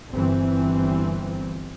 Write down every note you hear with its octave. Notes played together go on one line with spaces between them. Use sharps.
G1 E3 C4